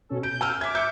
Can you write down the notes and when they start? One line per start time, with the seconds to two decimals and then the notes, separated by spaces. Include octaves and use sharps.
0.09 B2 C#4 A4
0.23 G6 D7
0.41 G#5 E6 F6
0.61 E5 D6 G#6 B6
0.75 G6 C#7